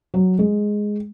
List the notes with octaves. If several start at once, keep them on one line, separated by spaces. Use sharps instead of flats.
F#3
G#3